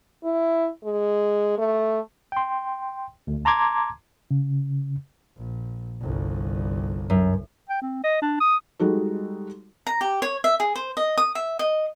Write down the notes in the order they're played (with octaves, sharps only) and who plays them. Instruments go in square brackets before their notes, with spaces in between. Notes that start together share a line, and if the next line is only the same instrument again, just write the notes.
[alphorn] E4
G#3
A3
[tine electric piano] G5 C6
D2
A5 A#5 C6 D6 G#6
[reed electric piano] C#3
[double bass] A#1
G1 C2
[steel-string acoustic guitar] F#2
[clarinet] G5
C4
D#5
D4
D#6
[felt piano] G3 G#3 D#4 F#4 A4
[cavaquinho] A#5
G4
C#5
E5
G#4
C5
D#5
D#6
E5
D#5